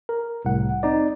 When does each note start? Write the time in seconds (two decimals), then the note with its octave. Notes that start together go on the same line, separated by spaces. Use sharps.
0.09 A#4
0.45 C2 A2 F#5
0.83 C4 D#4 D5